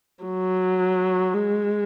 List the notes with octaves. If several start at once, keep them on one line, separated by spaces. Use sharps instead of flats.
F#3
G#3